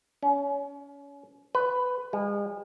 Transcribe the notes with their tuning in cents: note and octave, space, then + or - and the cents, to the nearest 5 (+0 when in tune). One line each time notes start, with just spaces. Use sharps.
C#4 +30
B4 +15
G#3 -40